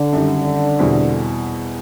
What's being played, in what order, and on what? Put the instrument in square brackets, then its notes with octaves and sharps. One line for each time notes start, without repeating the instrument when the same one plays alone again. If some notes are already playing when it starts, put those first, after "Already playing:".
Already playing: [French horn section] D3
[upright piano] F#2 D#3 G3
E2 B2 G3 C4 E4